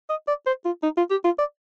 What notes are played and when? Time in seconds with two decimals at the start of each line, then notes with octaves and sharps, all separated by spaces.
0.10 D#5
0.28 D5
0.46 C5
0.65 F4
0.83 D#4
0.97 F4
1.11 G4
1.24 F4
1.39 D5